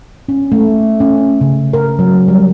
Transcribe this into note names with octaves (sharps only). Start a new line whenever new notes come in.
C#4
A3
C#4
C#3
A#4
F#3
G3